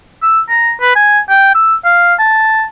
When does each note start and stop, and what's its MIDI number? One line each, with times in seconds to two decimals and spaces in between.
0.22 0.40 88
0.50 0.72 82
0.81 0.96 71
0.96 1.20 80
1.30 1.52 79
1.55 1.75 88
1.85 2.14 77
2.19 2.64 81